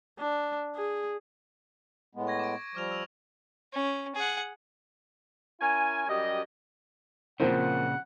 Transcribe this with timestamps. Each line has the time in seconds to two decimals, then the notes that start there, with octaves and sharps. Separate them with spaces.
0.19 D4
0.76 G#4
2.15 A2 G#3 B3
2.27 C#6 G#6 A#6
2.39 D6 D7
2.75 F3 G3 D6 F6 F7
2.91 E6 F7
3.74 C#4
4.15 G#4 F#5
5.60 C#4 E4 A#4 G#5
6.08 F#2 G3 G4 D#5
7.40 A#2 C#3 F3 A#3 C4 F#5